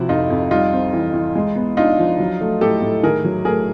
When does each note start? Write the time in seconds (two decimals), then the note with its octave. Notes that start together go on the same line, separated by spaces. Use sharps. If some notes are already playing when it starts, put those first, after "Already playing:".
Already playing: C3 F3 E4 F#4
0.09 F2 D#4 F4
0.30 F2
0.51 G3 D#4 F4
0.73 C4
0.93 E3
1.14 E3
1.36 G#3
1.56 B3
1.77 D4 D#4 F4
1.99 F3
2.19 F#3
2.41 A3
2.61 A2 G4 A4
2.82 A2
3.03 D#3 G#4 A#4
3.25 F#3
3.45 A3 G#4 A#4